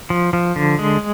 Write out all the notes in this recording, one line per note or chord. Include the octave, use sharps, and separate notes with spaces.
F3
F3
D3
G#3